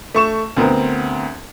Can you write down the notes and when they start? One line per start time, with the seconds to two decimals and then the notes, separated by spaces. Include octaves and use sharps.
0.15 A3 C#6 E7
0.57 D2 B3 C4 A#4